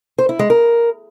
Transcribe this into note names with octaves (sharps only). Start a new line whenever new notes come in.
C5
E4
G#3
A#4